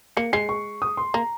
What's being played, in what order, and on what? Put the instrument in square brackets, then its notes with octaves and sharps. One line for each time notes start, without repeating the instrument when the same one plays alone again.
[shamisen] A#3 [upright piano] C#7
[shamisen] G#3 [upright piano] C7
[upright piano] C#6
D#6
C6
[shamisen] A#3 [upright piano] A#5